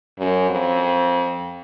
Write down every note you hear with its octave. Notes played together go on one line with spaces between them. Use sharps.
F#2
F2